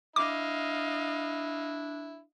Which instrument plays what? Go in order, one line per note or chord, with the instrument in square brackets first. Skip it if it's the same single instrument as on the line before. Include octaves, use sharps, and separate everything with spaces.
[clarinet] D4 [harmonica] E4 [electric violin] D#5 F5 [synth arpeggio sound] D6